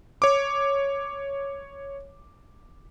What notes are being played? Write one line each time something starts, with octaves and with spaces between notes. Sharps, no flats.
C#5 D6